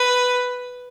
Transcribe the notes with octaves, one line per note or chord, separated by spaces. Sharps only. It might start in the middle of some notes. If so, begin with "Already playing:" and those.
Already playing: B4